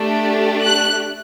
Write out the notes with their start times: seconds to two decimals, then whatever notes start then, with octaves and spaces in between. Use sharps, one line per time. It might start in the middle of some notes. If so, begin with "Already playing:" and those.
Already playing: A3 D4 G4
0.64 F#6